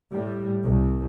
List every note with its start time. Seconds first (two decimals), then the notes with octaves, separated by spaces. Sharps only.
0.12 A2 G3
0.63 C2